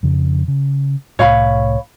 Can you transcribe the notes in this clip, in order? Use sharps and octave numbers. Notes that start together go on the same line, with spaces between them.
F2 C#3
C#3
C2 A2 C#5 F5 B5